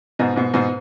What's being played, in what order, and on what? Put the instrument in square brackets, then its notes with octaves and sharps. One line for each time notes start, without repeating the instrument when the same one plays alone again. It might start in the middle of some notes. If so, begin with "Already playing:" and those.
[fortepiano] G#2 B2
G#2 B2
G#2 B2